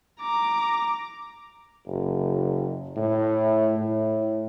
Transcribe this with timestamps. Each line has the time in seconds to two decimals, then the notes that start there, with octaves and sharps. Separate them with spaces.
0.21 A#5 D6
1.87 F#1
2.96 A2
3.76 A2